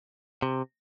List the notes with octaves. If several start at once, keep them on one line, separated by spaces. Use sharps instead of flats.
C3